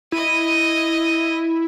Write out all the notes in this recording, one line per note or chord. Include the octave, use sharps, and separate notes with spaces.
E4 D#5 D#7